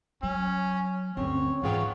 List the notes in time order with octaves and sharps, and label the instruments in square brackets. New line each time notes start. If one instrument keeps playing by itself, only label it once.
[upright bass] F#3 [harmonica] C#4
[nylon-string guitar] D2 G2 C4 [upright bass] C#4 [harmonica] C#5
[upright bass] G#2 [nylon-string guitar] E3 G#4 G5 [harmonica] F4 C#5 F#5